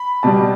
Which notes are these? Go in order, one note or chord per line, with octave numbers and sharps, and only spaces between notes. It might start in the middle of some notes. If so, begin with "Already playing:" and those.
Already playing: B5
B2 G3 A5